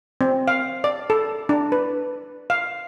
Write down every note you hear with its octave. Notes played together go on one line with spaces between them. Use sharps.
C4
F5
D5
A4
D4
B4
F5